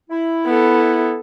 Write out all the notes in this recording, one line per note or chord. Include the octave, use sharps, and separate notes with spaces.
E4
B3 A4